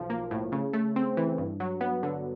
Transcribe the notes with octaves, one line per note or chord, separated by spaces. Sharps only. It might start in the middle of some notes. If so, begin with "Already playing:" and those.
Already playing: B1 F3
A#3
A2
C#3
A3
C4
E3
G2
F#3
B3
D3